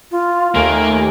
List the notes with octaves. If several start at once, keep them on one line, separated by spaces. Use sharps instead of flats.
F4
D#2 A3 A#3 G#5